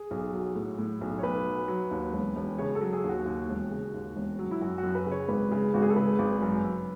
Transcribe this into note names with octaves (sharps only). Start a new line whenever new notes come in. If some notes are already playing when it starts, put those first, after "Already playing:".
Already playing: G#4
B1
F#3
A2
A2
B1
C#5
B1 B4
F#3
F#3
D#2
E1
E1
C#3 C#5
A4
F#3
G#4
D#2
F#4
D#2
E1
C#3
D#2
E1
F#3
E4
F#2 F#4
F#4
F#2
B4
C#3
C#5
G#1 B4
C#3
G#1 F#4
G#4
A4
C#3 B4
G#1
F#2
F#2